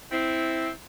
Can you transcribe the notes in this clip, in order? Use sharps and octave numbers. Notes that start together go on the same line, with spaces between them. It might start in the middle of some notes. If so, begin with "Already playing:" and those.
C4 E4